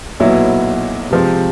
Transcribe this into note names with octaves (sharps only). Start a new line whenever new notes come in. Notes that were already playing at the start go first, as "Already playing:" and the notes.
B1 A#2 F#3 B3 E4
C3 F3 G#3 C4